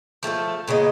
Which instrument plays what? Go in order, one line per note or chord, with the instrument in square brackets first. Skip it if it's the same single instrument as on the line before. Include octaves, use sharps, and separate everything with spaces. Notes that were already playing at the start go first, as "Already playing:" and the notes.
[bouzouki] F3 A3 G#4 A4
A#2 C#3 B3 D#5